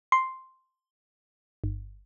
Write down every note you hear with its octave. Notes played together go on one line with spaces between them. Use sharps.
C6
G1